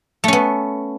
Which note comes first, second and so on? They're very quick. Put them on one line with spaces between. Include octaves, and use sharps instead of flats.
A3 C#4 B3